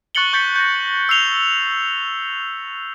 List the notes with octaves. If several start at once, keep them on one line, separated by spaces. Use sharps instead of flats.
C#6 F#6 A6 C#7 F#7 G7
C#6 G6 A6 B6 C#7
G6 A#6
E6 C7 F7 G7